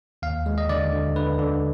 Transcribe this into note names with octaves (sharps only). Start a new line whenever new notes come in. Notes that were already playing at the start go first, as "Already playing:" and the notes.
D#2 F5
G#3
D#5
D3 D5
D3
D3 B4
D3